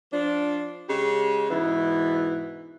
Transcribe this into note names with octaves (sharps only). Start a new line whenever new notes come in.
F3 D4
C#3 G#3 G4
G#2 B2 E3